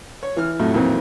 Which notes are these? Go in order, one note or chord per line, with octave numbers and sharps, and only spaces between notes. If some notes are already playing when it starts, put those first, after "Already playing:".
C#5
E3 F6
F2 A2 F#3 A3
F2 A#2 D#3 E3 F#3 C4